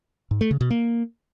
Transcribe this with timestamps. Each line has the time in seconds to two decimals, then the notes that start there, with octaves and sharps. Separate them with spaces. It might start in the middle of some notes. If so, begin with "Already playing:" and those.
0.31 G#2
0.41 A3
0.51 C#3
0.61 B2
0.70 A#3